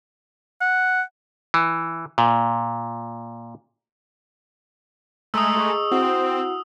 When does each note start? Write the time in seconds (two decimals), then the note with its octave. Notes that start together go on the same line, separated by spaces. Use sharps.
0.61 F#5
1.54 E3
2.18 A#2
5.34 G#3 A3 A#5 C6 D#6 E6
5.57 G#4 D#5 C#6
5.92 C4 E4 F#4 F#5